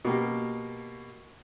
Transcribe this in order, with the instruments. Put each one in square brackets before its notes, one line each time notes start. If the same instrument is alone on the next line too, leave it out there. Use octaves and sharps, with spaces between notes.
[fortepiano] B2 A#3 G4